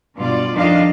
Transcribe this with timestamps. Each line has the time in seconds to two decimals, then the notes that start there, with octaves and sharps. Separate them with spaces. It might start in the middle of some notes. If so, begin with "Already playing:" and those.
0.17 G2 B2 F4 D5
0.53 F2 D#3 D4 F4 D#5 F5